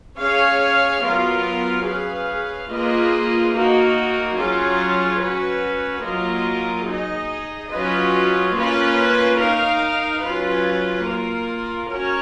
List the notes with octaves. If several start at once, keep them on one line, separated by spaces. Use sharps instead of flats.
C#4 G#4 C#5 F5
F#3 B3 F4 A#4 F5
C#4 G#4 B4 F5
A#3 F4 G#4 B4 D#5
A#3 D#4 F#4
F#3 C#4 F4 G#4
C#4 F#4 B4
F#3 A#3 F4 A#4 D#5
D#4 G#4 D#5
F#3 C#4 F4 B4 D#5
A#3 C#4 F4 B4
D#4 A#4 F5
F#3 C#4 F4 B4
A#3 F4 A#4
C#4 F#4 A#4 C#5